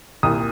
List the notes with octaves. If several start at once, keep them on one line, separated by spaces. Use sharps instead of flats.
C2 A#2 D#6